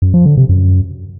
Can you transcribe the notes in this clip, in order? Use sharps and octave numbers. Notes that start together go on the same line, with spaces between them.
F#2
F3
D3
C3
F#2